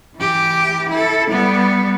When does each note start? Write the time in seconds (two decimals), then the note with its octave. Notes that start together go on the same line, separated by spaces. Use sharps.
0.16 E3 G4
0.90 E4 A4
1.31 G3 B3